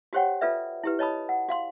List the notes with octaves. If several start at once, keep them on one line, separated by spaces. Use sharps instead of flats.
F#4 G4 C5 C#5 F#5 G5
F4 A4 B4 D5 E5
E4 G4 B4
C#5 D#5 A5 B5 D#6
F#5
F#4 F5 C6